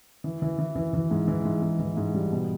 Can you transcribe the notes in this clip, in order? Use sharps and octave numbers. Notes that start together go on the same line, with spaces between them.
E3
E3
E3
E3
E3
G#2
E3
G#2
G#2
E3
G#2
G3
B2